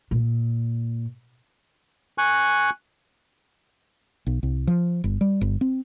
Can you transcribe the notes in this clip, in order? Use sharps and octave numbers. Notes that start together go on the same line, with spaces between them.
A#2
G#5 C#6 F#6
B1
C2
F3
G1
G3
G1
C4